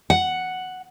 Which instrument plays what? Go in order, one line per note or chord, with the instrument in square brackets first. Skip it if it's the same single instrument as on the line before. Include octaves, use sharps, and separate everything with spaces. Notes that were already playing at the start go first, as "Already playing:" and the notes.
[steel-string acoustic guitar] F#5